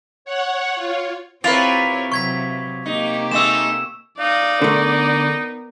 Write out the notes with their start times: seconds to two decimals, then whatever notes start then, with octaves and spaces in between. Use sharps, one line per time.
0.25 C#5 F#5
0.74 F4 C#5
1.44 C4 E4 F4 G4 A#4 B4 C#5 F7
2.12 C3 F#3 C#6 G#6 B6
2.86 C3 A#3 D#4 G4
3.31 G#3 A3 D#4 E6 E7
4.19 D#4 D5 F5
4.62 D3 A3 B3 A#4